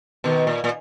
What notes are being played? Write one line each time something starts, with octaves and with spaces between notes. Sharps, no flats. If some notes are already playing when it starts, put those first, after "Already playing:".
B2 D#3
A#2
A#2